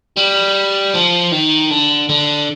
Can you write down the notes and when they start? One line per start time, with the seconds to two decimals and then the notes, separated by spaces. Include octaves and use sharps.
0.17 G3
0.94 F3
1.32 D#3
1.70 D3
2.09 D3